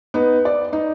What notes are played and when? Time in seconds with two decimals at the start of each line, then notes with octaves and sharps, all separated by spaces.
0.14 B3 D#4
0.45 D5
0.73 D#4